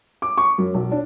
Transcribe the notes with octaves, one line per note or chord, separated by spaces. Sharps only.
D6
C#6
F#2
B1
D4